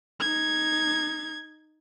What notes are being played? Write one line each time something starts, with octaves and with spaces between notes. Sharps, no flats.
D#4 G#6